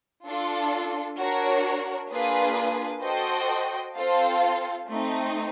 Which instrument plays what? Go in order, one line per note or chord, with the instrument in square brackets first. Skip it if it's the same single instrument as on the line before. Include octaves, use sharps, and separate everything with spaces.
[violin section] D4 F4 A4
D4 F#4 A#4 C#5
A#3 D4 F4 G#4 B4
F#4 A4 C5 D#5 G5
C4 F4 A4 C5 F5
A3 C4 D#4